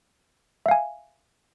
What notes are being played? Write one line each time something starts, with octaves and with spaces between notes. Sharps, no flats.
E5 F5 G#5